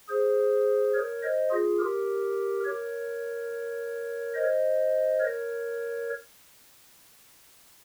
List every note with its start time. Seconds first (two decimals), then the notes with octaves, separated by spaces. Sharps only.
0.09 G#4 C5
0.94 A#4 C#5
1.23 C5 D#5
1.51 F4 G#4
1.79 G4 A#4
2.64 A#4 C#5
4.35 C5 D#5
5.20 A#4 C#5